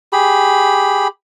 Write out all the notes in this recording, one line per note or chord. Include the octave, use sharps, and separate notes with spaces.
G4 G#4 B5